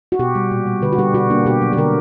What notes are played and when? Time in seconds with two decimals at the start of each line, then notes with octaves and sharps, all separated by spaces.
0.12 F#4
0.19 B2 G4
0.35 G3
0.51 A#2
0.67 G3
0.82 D3 B4
0.93 F#4
0.98 G3 G4
1.14 B2 F#4
1.30 A#3 D4
1.46 B2 G4
1.62 F#3
1.73 G4
1.77 D3 A#4